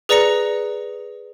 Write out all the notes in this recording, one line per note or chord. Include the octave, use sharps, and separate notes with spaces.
G#4 B4 D5 A#5 A#6 C#7